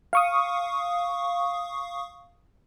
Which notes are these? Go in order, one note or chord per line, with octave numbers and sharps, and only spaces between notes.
F5 C#6 D#6